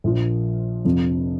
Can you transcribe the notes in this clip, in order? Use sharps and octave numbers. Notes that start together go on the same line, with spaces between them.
A#1 A#2 F3 A#3 F4
F1 F2 F3